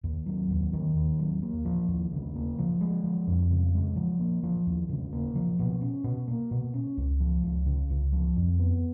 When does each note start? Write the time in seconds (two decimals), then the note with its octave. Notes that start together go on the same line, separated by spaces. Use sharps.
0.04 D#2
0.26 F#3
0.50 D#2
0.73 D#3
0.96 D#2
1.19 F#3
1.42 A#3
1.65 F3
1.88 D#2
2.12 C#3
2.35 A#3
2.59 F3
2.81 G#3
3.04 F3
3.27 F2
3.50 C#3
3.74 G#3
3.96 F3
4.19 A#3
4.43 F3
4.66 D#2
4.89 C#3
5.13 A#3
5.35 F3
5.59 B2
5.81 C#4
6.04 B2
6.28 A#3
6.51 B2
6.74 C#4
6.97 C#2
7.20 F3
7.43 C#2
7.66 C#3
7.90 C#2
8.12 F3
8.36 F2
8.59 B3